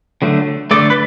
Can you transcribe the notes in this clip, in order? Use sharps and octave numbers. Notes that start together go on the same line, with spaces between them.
D3 F#3 A3
D3 A3 D5
B4